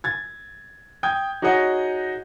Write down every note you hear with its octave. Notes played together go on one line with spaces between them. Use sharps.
G#6 A6
G5 D#6 G6 G#6
D#4 F#4 G#4 C#5 D#5 F#5